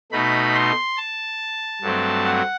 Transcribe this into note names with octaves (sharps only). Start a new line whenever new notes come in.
B2 A3 D#4 B5
C6
A5
G2 F#3 A3 C4
F#5